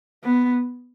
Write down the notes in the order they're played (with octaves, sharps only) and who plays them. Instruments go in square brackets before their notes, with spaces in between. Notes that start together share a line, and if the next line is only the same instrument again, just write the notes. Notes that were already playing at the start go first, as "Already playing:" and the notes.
[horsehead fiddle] B3